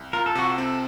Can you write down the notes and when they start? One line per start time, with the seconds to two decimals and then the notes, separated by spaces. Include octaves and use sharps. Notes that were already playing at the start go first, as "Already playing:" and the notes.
Already playing: C2
0.13 F4 A#4
0.26 A4
0.35 C3 F#4
0.50 A4
0.58 C4